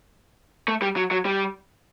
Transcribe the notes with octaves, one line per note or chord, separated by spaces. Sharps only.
A3
G3
F#3
F#3
G3